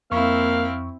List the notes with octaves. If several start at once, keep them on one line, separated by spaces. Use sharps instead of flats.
F2 A#3 C4 E4 F5 C#6